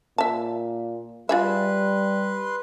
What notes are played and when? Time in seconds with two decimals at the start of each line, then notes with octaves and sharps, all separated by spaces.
0.18 A#2 E5 A5
1.29 G3 F4 G#4 B4 E5 C6